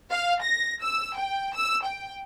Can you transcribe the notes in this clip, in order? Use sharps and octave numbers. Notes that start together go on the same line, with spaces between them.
F5
A#6
E6
G5
E6
G5